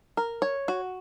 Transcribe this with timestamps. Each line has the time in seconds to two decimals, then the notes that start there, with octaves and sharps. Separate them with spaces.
0.17 A#4
0.42 C#5
0.68 F#4